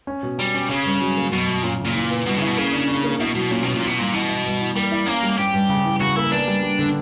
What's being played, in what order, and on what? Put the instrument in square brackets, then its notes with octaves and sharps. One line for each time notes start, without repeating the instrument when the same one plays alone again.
[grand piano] C#4
B2
[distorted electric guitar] G3 [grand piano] C#4
[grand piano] C#4
[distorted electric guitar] C#3 [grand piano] C#4
[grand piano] G2
F#3
A#3
[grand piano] F#2 [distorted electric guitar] B2
[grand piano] F#2
[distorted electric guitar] A#2 [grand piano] C#4
[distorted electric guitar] A#2 [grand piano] C#3
[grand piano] E3
B3
[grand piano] G2 [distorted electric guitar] B2
[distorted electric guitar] C#3
[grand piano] E4
[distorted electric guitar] B2
[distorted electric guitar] C#3 [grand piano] A#3
[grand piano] D4
D4
A#3
[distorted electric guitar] B2 [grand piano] E4
[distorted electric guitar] B2 [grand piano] F#3
[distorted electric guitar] A#2 [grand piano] C#4
[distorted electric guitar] B2 [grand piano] C#4
[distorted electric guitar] A#2
[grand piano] E3
[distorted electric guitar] B2
[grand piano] G2 [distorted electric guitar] A#2
[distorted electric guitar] B2 [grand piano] E3
[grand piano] E4
G2
E3
[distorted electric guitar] G3 [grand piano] A#3
[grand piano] E4
[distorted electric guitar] A#3 [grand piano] C#4
[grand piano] G3
[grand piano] G2 [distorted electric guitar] G4
[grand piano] G2
C#3
E3
[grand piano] C#3 [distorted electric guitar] F#4
[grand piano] A#3 [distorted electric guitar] E4
[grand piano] B3 [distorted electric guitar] D4
[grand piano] G3
G3
D3